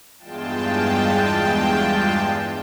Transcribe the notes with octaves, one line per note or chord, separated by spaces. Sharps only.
E2 G2 G#3 F4 G5 A5